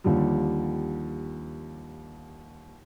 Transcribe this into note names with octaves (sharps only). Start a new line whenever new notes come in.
D#2 D3 F3 G3